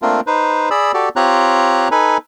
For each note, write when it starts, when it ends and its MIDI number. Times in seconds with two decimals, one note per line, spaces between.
0.02 0.21 57
0.02 0.21 58
0.02 0.21 60
0.02 0.21 62
0.02 0.21 65
0.02 0.21 70
0.27 0.69 63
0.27 0.69 71
0.27 0.69 72
0.71 0.92 68
0.71 0.92 74
0.71 0.92 83
0.71 0.92 88
0.94 1.09 66
0.94 1.09 67
0.94 1.09 69
0.94 1.09 74
1.16 1.88 60
1.16 1.88 65
1.16 1.88 67
1.16 1.88 73
1.16 1.88 82
1.16 1.88 90
1.91 2.17 63
1.91 2.17 69
1.91 2.17 71
1.91 2.17 80
1.91 2.17 83